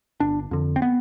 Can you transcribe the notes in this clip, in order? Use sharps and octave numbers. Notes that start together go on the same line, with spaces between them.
G1 D4
F2 D3
C4
B3